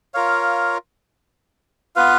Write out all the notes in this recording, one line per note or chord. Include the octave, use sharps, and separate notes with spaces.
F4 A#4 C#5 F5
B3 F4 B4 F5